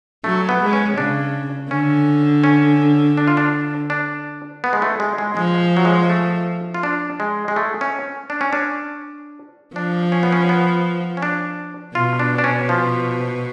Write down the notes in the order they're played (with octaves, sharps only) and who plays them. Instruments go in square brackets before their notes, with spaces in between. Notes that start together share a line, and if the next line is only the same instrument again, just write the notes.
[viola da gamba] F#3 [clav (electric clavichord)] A3
[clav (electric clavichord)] B3
[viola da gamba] G#3
[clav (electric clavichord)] C#4
[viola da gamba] C#3 [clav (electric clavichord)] D4
[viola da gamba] D3 [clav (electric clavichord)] C#4
[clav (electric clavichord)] C#4
D4
F4
D4
D4
B3
G#3
A3
G#3
G#3
[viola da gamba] F3 [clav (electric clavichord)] G#3
[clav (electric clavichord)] F#3
G#3
A3
F4
D4
G#3
G#3
A3
C#4
D4
C#4
D4
[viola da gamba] F3 [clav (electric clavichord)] D4
[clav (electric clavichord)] C#4
B3
C#4
B3
C#4
D4
[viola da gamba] B2 [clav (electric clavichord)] F4
[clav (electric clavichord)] D4
D4
C#4
F3